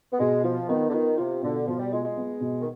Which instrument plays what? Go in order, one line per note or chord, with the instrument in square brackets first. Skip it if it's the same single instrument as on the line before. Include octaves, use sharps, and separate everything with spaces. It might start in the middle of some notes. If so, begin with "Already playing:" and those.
[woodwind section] B3
[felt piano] B2 [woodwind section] G#3
[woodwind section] F3 [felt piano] F4
[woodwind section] D#3 [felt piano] B3
[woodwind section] D3
[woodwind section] D#3 [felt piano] F4
[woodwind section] C3 [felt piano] F4
[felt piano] B2 [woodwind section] D3
[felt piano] B2 [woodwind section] F3
[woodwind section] G3
[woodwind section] G#3 [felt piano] F4
[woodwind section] G#3
[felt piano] B3
B2
[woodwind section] D#3